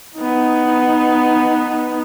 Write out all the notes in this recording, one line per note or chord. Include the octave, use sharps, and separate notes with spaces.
B3 D#4